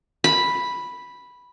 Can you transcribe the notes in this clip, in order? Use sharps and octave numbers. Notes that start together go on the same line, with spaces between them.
B5